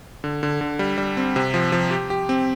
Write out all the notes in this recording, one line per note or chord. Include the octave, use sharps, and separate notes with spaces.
D3
D3
D3
G3
G3
C4
C3
F3
F3
G4
G4
C4